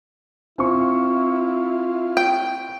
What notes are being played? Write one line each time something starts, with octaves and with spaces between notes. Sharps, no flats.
C4 E4 F4 C#6
G5